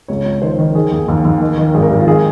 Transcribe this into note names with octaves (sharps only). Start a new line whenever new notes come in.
C#2 C#5
C#2
D#3 C5
D#3
D#3 G#4
D#2 G#4
D#2
D#2
D#3
D#3
G#1 G#4
A#4
G#1 G4
F4
D#3 G#4